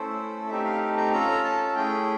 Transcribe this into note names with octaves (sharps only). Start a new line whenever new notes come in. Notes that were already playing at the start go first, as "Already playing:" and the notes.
Already playing: A3 C#4 E4 A4 C5
A3 C4 D#4 G4 E5
F5
A#5
C#4 F4 A4 A#5
A5
A3 C#4 E4 G#4 G5